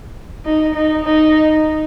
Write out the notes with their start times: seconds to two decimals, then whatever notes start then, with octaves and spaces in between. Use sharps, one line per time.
0.45 D#4
0.75 D#4
1.05 D#4